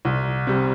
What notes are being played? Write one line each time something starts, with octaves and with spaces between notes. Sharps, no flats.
C2
C3 G3